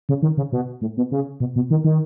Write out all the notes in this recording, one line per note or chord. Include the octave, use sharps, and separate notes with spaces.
C#3
D#3
C#3
B2
A2
B2
C#3
B2
B2
D#3
D#3